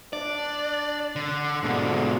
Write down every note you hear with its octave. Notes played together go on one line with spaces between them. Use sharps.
D4 D5
D3
G#2 B2 D3